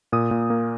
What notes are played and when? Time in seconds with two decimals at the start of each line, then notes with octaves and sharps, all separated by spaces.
0.12 A#2 D#6
0.31 A#2
0.50 A#3